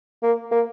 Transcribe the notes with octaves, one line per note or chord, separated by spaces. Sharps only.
A#3
A#3